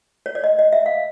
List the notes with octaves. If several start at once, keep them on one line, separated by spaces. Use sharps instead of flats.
C#5
D5
D#5
D#5
E5
F5